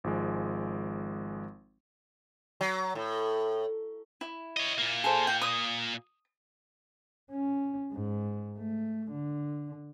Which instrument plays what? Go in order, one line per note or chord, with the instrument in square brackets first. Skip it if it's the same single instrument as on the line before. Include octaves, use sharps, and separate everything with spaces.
[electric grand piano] G#1 F3 G#3
[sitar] F#3
A2
[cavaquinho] E4
[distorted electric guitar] C#5 D#5
A#2 A#3
[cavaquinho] G#4 A4 C5
G5
D#6
[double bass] C#4
G#2
A3
D3